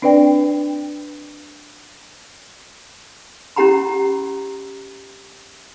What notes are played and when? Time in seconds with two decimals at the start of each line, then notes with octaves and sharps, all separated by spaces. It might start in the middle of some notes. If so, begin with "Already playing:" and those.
0.02 C4 D4 B4 D5 G5
3.56 C#4 E4 G4 F#5 A#5 B5